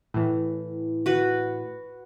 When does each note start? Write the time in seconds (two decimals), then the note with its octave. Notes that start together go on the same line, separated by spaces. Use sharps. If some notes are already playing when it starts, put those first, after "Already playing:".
0.14 A2 E3
1.06 F#4 B4